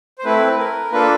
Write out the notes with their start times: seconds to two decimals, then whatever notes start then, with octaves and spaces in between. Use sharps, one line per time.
0.19 C5
0.24 A3 C4 E4 B4
0.59 A#4
0.92 A#3 D4 F4 A4 B4